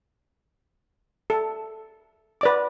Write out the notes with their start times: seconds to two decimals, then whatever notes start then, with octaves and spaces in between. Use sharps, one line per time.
1.30 A4
2.41 B4 D5 D6